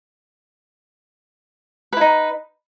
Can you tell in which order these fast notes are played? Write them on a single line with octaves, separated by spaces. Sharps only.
B4 E4 D#4